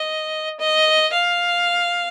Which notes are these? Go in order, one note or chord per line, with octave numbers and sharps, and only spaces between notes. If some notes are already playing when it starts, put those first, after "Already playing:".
Already playing: D#5
D#5
F5